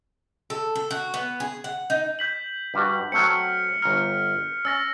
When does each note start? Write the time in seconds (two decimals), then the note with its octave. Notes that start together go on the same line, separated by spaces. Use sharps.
0.50 A4
0.76 A4
0.91 F#4
1.14 B3
1.40 G#4
1.64 F#5
1.90 D#4
2.19 G6 B6 F#7
2.74 G2 G3 F#4
3.12 F#3 A3 C4 F6 C#7
3.82 G1 A#5 F6
4.65 C#4 E6 A6 A#6